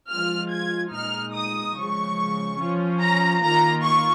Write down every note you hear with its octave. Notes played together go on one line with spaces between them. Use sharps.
F3 G#3 F4 F6
G#6
A#2 G#3 D#4 F6
D#6
C#3 F3 G#3 C#6
F3 C#4 F4
A#5
D#3 A#3 F4 A#5
C#6